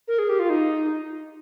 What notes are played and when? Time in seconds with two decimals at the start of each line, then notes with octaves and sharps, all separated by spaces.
0.08 A#4
0.19 G#4
0.29 G4
0.39 F4
0.50 D#4